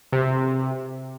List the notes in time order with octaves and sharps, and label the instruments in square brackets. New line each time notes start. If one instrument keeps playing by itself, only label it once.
[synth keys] C3